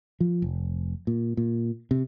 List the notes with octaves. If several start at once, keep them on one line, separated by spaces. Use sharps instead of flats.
F3
F1
A#2
A#2
C3